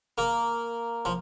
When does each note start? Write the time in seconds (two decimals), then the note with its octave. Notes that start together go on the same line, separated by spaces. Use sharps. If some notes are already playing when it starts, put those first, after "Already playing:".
0.18 A#3
1.05 F3